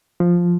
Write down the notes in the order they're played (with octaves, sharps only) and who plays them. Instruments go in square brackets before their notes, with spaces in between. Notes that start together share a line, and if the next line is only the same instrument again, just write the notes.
[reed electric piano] F3